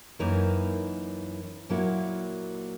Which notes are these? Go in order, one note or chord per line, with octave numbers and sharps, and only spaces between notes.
F#2 E3 A#3 D#4 A#4
A#2 F#3 A#3 E4